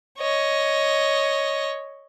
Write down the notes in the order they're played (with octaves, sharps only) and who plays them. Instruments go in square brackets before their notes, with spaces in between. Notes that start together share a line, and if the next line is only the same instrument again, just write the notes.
[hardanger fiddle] C#5 D#5